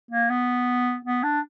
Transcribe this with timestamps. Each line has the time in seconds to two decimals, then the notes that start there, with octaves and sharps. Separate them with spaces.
0.11 A#3
0.30 B3
1.05 B3
1.23 D4